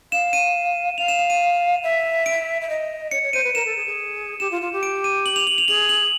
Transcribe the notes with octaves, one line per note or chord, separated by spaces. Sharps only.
F5 E7
D#7
F5 F7
E7
E7
D#7
E5
D7
E5
D#5
C#5 C#7
C#5
C5 D#7
B4
A#4 E7
A4
G#4
G#4
G4 E7
F4
F4
G4
D7
D#7
F#7
F7
F#7
F7
G#4 F#7
F#7